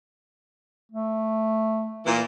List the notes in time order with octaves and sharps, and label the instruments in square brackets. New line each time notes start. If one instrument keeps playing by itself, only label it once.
[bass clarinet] A3
[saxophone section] A#2 E3